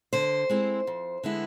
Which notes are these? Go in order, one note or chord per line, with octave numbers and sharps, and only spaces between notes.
D3 C5
G#3 C4 E4
F2
D3 G#3 B3 E4